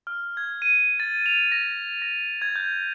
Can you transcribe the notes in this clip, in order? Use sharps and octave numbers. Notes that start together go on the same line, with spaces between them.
F6
G#6
D#7
A6
F7
A#6
A#6
G#6
G6